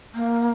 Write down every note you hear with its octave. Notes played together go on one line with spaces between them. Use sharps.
A#3